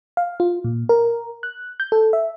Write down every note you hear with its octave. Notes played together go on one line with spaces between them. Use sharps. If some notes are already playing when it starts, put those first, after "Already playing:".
F5
F4
A#2
A#4
F#6
G6
A4
E5